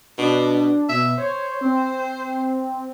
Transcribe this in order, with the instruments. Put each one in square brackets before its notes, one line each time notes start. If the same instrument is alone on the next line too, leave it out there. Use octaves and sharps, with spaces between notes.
[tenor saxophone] B2 [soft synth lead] D4
[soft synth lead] B2 [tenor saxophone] E5
[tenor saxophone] C5 [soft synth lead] C#5
[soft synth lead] C4